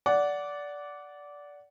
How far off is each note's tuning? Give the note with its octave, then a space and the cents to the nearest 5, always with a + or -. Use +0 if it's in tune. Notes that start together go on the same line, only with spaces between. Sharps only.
D5 -15 F#5 +0